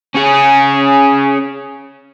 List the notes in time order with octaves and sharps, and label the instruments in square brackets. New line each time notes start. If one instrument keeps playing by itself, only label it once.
[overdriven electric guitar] C#4 G#4